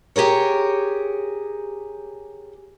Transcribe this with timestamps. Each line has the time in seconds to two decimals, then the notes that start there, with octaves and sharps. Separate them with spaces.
0.16 G4 G#4 A#4 C#5